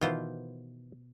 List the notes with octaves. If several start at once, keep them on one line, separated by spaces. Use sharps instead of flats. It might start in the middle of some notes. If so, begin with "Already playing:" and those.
B2 D#3 E3 F4 C5